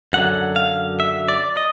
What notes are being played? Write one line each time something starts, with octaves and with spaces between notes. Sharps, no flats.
F#2 D3 F#3 F#5
F5
E5
D5
D#5